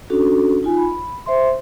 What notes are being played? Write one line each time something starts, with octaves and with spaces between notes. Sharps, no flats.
C#4 D4 F#4 A4
D#4 F4 G#5
B5
C5 E5 C6